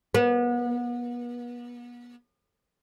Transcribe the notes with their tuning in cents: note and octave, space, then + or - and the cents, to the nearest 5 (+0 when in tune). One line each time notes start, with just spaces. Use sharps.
B3 -35